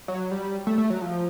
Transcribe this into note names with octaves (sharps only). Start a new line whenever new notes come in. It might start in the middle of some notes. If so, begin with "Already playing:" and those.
F#3
G3
A3
A3
F#3
F3